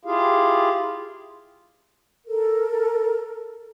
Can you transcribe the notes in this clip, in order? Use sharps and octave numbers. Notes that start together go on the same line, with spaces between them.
E4 F4 G4 G#4 F5
A4 A#4